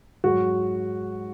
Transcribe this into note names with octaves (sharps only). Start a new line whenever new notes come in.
G#2 F#3 F#4